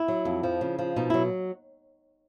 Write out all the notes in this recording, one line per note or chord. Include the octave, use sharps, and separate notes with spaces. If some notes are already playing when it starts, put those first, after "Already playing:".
Already playing: E4
F#3
F2
F3
C#3
F3
B2 D#4
F#3 E4